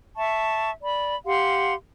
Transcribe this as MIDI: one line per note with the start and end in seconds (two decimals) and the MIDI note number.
0.16 0.71 76
0.16 0.71 81
0.16 0.71 85
0.82 1.15 74
0.82 1.15 83
1.26 1.74 67
1.26 1.74 77
1.26 1.74 78
1.26 1.74 84